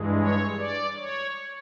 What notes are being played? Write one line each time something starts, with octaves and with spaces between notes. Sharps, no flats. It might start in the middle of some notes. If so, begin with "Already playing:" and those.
Already playing: G2 E3 G#3
C#5
D5
C#5